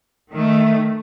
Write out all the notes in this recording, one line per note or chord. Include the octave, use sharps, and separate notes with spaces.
D#3 A3